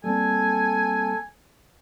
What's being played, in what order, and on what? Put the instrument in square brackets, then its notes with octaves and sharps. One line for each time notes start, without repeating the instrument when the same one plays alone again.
[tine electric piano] G3 A#3 C4 [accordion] A4 [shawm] G#5